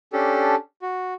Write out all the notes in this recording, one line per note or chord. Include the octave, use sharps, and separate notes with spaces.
C#4 D4 G4 A4
F#4